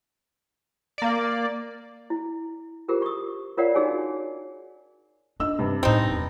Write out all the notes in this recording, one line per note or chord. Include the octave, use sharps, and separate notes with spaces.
A#3 D5
E4
F4 G4 G#4 A#4 C5
C#6 D#6
F4 A#4 C#5 D5 F5 F#5
D4 D#4 F#4 G#4 C#5 G#5
D4 D#4 D#5 E6
G2 C3
A2 B3 C4 D#4
E2